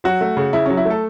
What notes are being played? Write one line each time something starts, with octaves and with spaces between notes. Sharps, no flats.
F#3 F#4
A3
C#3
C#3 E4
F#3 C#4
E4
A3
A4